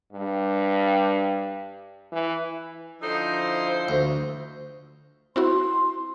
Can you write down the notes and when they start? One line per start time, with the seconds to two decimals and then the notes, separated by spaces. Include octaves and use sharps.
0.13 G2
2.12 E3
3.01 D3 F3 D#4 E4 C5
3.89 D2
5.36 C4 E4 F#4 C6